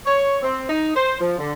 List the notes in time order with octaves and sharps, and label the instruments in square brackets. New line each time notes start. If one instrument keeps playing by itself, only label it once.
[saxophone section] C#5
C4
D#4
C5
F3
D3